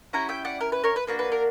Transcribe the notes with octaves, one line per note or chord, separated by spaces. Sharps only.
C#4 E4 G4 F#5 A#5
E5 G5
D5 F#5
A#4
B4
A#4 C#5
B4
A#3 D4 F#4 B4
B4
A#4